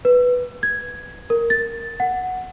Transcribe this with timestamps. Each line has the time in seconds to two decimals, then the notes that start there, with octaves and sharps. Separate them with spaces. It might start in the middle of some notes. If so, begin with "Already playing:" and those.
0.05 B4
0.63 G#6
1.30 A#4
1.50 A6
2.00 F#5